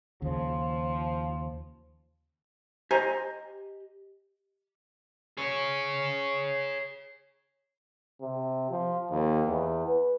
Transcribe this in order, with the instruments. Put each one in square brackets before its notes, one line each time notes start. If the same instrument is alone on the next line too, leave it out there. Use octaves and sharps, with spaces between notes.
[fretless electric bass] D#2 C#3 [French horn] F3
[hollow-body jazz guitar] G4 D#5 [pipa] C5 G#5 A#5
[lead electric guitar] G#4 C#5
[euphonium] C3
F3
D#2
E2
B4